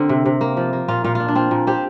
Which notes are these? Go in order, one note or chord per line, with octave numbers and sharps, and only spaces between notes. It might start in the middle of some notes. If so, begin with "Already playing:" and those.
Already playing: D3 C4 G4 A#4
C3
C3
A#3
F3
A#3
A#2 F4
A#2 F4
D4 F4
D4
C4 F4
A#2
C4 G4 C5